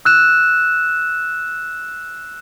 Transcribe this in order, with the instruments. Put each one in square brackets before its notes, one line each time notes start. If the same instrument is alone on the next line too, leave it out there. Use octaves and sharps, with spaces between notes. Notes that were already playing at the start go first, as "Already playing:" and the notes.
[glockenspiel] E6 F#6 E7